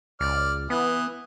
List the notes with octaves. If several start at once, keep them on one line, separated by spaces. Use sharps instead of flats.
C#2 D5 F6
E3 B3 D#6